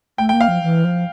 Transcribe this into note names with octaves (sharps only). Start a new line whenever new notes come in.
A3 G5
G5
A#3
F5
F3
E3
F3